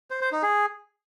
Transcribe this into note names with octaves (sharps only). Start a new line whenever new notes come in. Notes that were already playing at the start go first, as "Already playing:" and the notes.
C5
C5
D#4
G#4